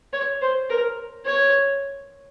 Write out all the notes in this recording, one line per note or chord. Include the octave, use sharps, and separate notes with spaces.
C#5
C5
A#4
C#5